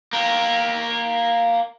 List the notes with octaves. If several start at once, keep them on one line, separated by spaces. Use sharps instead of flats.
A#3 G4